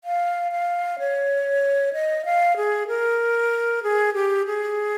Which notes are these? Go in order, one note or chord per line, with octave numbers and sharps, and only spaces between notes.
F5
F5
C#5
D#5
F5
G#4
A#4
G#4
G4
G#4